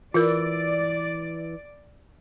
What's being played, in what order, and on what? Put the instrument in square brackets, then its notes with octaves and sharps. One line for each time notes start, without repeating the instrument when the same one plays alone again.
[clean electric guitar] E3 [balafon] F4 A#4 [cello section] D5